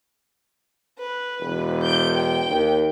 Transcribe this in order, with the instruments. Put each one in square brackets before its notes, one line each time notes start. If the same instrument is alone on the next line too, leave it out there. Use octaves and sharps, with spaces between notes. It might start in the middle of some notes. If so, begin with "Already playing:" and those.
[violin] B4
[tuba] E1
[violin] G6 D7
G5
[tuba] D#2